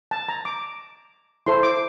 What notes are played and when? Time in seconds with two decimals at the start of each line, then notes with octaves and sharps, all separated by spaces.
0.11 A5
0.29 A#5
0.45 D6
1.46 E4 A4 C5 C6
1.63 D6